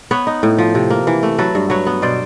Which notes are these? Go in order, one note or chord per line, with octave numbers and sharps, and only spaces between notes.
B3 B4 C#5
D#4
A2
F3
C3
A#3
E3
A3
F#3 A4 B4
G2
F#3 B4 C#5
B3
B2 C5 D5